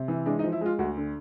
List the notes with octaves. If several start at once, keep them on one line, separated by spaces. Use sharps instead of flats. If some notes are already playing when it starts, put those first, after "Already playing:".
Already playing: C3
E3
G#3 D4
D#4
F3
E4
G#3 F4
D2 F#4
D3